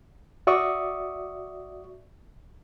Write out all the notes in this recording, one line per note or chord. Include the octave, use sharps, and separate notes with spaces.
F#4 D5 E5 C#6 D#6